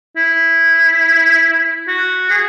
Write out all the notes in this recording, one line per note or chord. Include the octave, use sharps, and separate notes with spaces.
E4
F#4
G#4